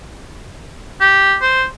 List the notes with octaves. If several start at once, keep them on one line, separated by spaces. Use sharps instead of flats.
G4
C5